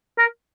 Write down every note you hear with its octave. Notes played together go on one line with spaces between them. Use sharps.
A#4